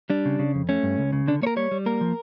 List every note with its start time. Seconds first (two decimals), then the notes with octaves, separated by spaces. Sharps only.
0.10 G3 D4
0.25 C#3
0.39 C#3
0.55 F2
0.69 A3 C#4
0.83 G2
0.98 C#2
1.13 C#3
1.28 D3 D4
1.42 A#3 C#5
1.47 A#4
1.56 G3 C#5
1.71 G3
1.86 A#3 A#4
2.01 F3